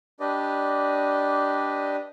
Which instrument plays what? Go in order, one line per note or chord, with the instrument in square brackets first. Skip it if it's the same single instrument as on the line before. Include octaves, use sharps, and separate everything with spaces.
[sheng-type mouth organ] D4 G4 B4 D5 D#5